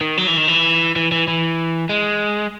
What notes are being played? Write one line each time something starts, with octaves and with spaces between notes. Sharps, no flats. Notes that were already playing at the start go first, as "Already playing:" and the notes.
D#3
F#3
E3
D#3
E3
E3
E3
E3
G#3